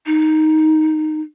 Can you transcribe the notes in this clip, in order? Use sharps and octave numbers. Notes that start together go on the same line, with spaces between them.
D#4